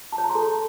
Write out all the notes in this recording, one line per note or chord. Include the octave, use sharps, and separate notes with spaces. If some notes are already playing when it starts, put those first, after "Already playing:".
A5
C#5
A#5
C6
A4